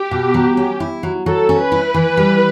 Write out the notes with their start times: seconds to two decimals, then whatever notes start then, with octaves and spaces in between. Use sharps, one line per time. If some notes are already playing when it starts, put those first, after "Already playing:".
Already playing: G4
0.11 B2
0.34 F#3
0.57 C#4
0.80 E4
1.03 F#3
1.26 F#3 A4
1.49 C#4
1.61 B4
1.72 E4
1.94 E3
2.17 G3